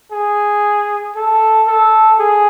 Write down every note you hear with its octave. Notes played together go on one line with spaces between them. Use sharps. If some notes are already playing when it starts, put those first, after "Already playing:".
G#4
A4
A4
G#4